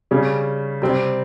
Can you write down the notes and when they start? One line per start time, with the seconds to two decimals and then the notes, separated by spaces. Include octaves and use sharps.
0.11 C#3 G3 C#4
0.82 C3 G3 C4